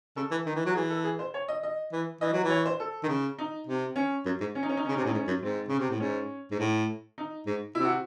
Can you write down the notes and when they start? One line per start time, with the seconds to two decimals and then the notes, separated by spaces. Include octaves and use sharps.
0.16 C#3 A4
0.31 E3
0.46 D#3
0.56 E3
0.66 F#3
0.75 E3 G#4
0.90 A4
1.04 G#4
1.19 C5
1.34 C#5
1.48 D#5
1.63 D#5
1.92 E3
2.21 E3 D#5
2.33 F#3
2.44 E3
2.50 C#5
2.66 C5
2.80 A4
3.03 D#3
3.08 C#3
3.38 D#4
3.67 C3
3.96 C#4
4.25 F#2
4.40 G#2
4.55 C#4
4.63 D#4
4.69 C#4
4.77 D#4
4.85 C#4
4.88 C#3
4.92 D#4
4.96 C3
5.01 C#4
5.04 A2 D#4
5.14 G#2
5.16 C#4
5.27 F#2
5.42 G#2 C4
5.69 C#3
5.79 C3
5.90 A2
6.00 G#2 C#4
6.51 G#2
6.59 A2
7.18 D#4
7.46 G#2
7.75 C3 E4
7.85 F#4